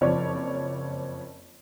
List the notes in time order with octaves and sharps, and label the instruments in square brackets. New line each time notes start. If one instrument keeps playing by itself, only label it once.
[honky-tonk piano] F#1 F2 F3 C#5 D5